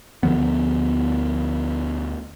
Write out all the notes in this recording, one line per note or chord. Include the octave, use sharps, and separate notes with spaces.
D2 D3 F3 B3